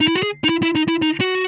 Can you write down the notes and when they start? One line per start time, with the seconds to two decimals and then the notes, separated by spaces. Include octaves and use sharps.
0.01 D#4
0.08 E4
0.16 F#4
0.23 G#4
0.44 D#4
0.49 E4
0.63 E4
0.75 D#4
0.88 E4
1.02 D#4
1.21 F#4